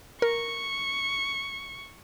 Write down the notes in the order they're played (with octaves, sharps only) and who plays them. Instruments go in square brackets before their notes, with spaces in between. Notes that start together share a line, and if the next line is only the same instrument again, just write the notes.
[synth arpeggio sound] A#4 [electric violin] C#6